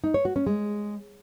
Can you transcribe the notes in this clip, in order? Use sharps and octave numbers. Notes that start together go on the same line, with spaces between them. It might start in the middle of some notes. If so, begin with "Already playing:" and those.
D#4
C#5
F#4
C#4
G#3